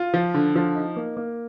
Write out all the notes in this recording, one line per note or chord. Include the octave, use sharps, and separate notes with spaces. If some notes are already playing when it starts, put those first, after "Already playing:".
Already playing: F4
F3
D3
F3
D#4
A#3
A#3